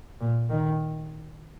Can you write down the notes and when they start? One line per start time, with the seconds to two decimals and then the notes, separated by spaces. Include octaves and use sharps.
0.20 A#2
0.50 D#3